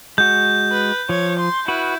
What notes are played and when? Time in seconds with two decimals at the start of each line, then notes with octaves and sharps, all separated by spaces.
0.18 G#3 F#4 G6
0.72 B4
1.09 F3 C#5
1.39 C6
1.68 E4 F#4 B4